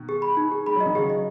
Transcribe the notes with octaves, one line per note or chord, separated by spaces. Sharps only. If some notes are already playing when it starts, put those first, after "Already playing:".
Already playing: B2 D#3
G#4
B5
D#4
G#4
G#3 B5
F#3 D#5
D#3
C#3 F#3 G#4
D#5